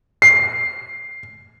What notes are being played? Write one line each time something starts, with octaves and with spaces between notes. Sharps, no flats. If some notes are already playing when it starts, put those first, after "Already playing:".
C7